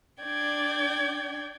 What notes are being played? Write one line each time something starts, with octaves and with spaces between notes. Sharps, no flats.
D4 D5 G5 G#6